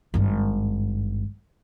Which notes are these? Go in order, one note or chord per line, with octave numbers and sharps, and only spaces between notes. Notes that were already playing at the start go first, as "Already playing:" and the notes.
G#1 G2